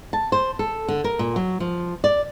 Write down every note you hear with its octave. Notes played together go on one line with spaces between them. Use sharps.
A5
C5
A4
D3
A#4
A#2
F#3
F3
D5